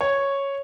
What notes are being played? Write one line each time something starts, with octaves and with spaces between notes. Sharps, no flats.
C#5